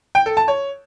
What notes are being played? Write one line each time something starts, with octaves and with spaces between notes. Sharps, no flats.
G5
A4
A5
C#5